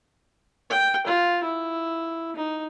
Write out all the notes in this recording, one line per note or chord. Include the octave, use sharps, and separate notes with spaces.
G5
F4
E4
D#4